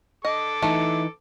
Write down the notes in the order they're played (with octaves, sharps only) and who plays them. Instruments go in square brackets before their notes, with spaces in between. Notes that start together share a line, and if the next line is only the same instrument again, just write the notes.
[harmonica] A4 D6 [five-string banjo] D#5
[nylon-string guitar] E3 D#4 [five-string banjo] A3